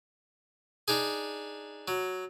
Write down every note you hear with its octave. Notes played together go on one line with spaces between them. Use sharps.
D4 D#4 G#4
F#3